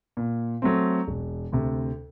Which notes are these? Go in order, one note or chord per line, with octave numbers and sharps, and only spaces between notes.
A#2
F#3 A3 C4
E1
D2 C3